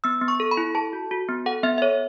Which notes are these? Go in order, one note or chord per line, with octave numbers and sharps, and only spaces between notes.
B3 E6
B3
C#6
A4
B5
E4
A4 A5
F#4
F#4
B3
A4 F#5
B3 E5
E5
A4 C#5